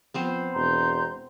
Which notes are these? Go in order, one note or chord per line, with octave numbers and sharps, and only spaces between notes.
F3 B3 C4 C5
E1 A#5 C6 G6